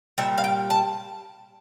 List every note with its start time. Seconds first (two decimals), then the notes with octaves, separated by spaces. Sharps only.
0.18 A#2 G3 E5
0.38 F5
0.44 G5
0.70 A5